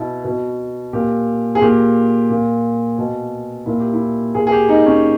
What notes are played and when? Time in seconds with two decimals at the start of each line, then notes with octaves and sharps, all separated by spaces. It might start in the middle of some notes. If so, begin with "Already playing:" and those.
Already playing: B2 E4
0.24 B2
0.93 A#2 G4
1.55 G#4
1.61 A#2 G4
2.30 A#2
2.98 B2
3.66 A#2 E4
3.80 G4
3.94 E4
4.35 A#2 G#4
4.47 G#4
4.52 G4
4.69 D#4
4.86 C#4